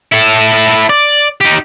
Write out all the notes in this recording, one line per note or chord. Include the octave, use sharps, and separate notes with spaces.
E4 A4
D5
D#4 G4